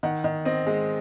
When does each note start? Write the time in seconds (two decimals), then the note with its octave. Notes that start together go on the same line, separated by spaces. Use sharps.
0.03 D#3 F#5
0.24 D#3
0.45 C4 D#5
0.67 G#3